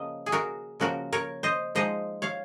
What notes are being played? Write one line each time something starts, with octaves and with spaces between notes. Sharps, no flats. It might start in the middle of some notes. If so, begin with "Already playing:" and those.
Already playing: C#3 F3 A#3 D#5
G#4
F#4 A#4
C#3 F3 A#3 F#4 A#4
A#4 C#5
C5 D#5
F3 G#3 D#4 C5 D#5
C#5 F5